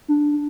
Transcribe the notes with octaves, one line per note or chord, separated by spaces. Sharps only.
D4